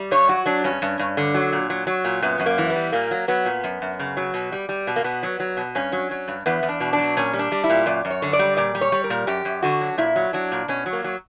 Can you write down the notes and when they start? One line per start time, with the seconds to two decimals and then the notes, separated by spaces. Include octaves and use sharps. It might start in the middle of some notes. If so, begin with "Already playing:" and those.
Already playing: G3
0.11 G2 C#5
0.28 F#3 F#4
0.46 F#3 D4
0.64 G2 C#4
0.82 G2
0.99 G2
1.17 D3
1.34 F#3
1.52 A#2
1.70 F#3
1.87 F#3
2.04 A#2
2.22 F#2 B3
2.40 F#2
2.46 A#3
2.58 E3
2.70 B3
2.75 G3
2.92 A#2 A#3
3.11 F#3
3.28 F#3 B3
3.45 A#2
3.64 F#2
3.82 F#2
3.99 C#3
4.17 F#3
4.34 B2
4.52 G3
4.69 G3
4.87 B2
4.96 A#3
5.04 B2 B3
5.23 F#3
5.40 F#3
5.57 B2
5.75 G2 C#4
5.92 F#3
6.11 F#3
6.28 G2
6.46 E2 B3
6.63 E2
6.69 D4
6.80 B2
6.93 D4
6.98 F#3
7.17 A#2 C#4
7.33 G3
7.39 D4
7.52 G3
7.64 E4
7.70 A#2
7.86 F#2 D5
8.05 F#2
8.11 C#5
8.22 D3
8.33 D5
8.39 G3
8.57 A#2 D5
8.75 G3
8.81 C#5
8.92 G3
9.04 A#4
9.10 A#2
9.27 F#2 G4
9.45 F#2
9.63 D3 F#4
9.81 F#3
9.98 A#2 E4
10.16 F#3
10.33 F#3 D4
10.52 A#2
10.68 B2 C#4
10.86 F#3
10.93 A#3
11.04 F#3